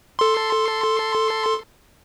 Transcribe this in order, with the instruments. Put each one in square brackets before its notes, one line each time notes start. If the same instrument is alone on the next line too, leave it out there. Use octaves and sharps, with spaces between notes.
[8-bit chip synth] A4 C6